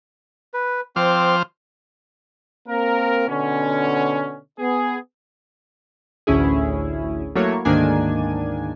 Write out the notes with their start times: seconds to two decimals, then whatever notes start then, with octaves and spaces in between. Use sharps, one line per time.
0.54 B4
0.96 F3 C4 C5 D6 F6
2.68 A#3 C4 A#4
3.28 B2 D3 C#4
4.59 B3 G#4
6.27 A1 D2 C#4 E4 G#4
7.35 F#3 A3 A#3 E4 C#5
7.65 D2 G#2 D#3 A#3 D4 G#5